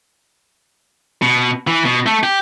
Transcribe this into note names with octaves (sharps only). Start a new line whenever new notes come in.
B2
E3
B2
A3
G4